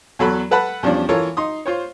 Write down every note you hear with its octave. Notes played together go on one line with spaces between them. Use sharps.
E2 F#3 A4 B5 F#6
A4 B4 F#5 A5 B5
E2 F3 G3 C#4 D4
E3 F4 A4 A#4 C#5
D#4 C6 D#6
F4 C5 C#5